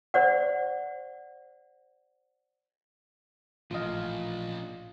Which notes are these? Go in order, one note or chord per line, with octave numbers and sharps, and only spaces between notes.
C5 D5 F#5
A1 A#2 F3 F4 D#5 F5